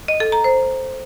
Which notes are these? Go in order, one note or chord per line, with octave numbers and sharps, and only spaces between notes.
D#5
A4
A#5
C5